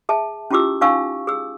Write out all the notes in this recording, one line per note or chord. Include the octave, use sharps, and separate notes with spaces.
G#4 E5 A5
C#4 E4 F4 G4 D6 E6
C#4 D#4 F5 G#5 C#6 E6
G#4 E6